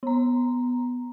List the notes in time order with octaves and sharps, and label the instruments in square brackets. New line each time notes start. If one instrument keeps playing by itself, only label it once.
[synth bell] B3 A#5